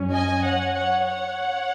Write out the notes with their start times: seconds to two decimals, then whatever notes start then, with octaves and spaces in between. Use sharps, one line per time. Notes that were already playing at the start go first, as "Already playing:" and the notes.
Already playing: F#2 F#3 C#4
0.13 D#5 G#5
0.44 C#5 F#5
0.74 C#5 F#5
1.05 C#5 F#5